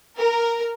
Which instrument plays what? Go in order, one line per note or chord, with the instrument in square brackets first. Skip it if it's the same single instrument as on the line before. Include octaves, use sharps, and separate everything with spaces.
[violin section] A#4